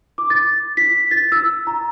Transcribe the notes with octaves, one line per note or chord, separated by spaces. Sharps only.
D6
A6
B6
A6
E6
A#5